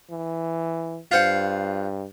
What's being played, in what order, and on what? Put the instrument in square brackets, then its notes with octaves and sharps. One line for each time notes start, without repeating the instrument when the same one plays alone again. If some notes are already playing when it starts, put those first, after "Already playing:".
[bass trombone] E3
[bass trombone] G2 [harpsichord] F4 C5 F#5